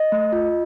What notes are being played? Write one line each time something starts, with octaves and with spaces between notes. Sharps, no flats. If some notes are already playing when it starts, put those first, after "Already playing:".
Already playing: D#5
A3
F4